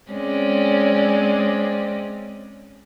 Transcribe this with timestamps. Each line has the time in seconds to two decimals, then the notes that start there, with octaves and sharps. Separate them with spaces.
0.11 G#3 C4 C#4 D5